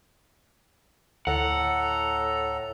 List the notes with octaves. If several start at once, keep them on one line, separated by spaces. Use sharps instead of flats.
D2 A2 A4 F#5 A#5